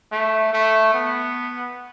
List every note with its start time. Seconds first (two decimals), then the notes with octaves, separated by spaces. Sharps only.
0.12 A3
0.53 A3
0.94 B3